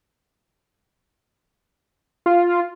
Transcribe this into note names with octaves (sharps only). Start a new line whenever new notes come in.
F4